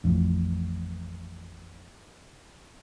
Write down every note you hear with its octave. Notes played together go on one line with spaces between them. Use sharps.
A1 F2